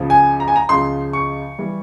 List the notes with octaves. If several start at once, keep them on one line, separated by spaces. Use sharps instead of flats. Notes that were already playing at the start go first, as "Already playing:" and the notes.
Already playing: C#2 C#3 F3 G#3
G#5
A#5
G#5
A#5
C#2 C#3 F3 G#3 C6
C#6
E3 G3